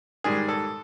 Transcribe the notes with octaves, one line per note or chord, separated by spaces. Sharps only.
G#2 D#3 G3 G#4
A4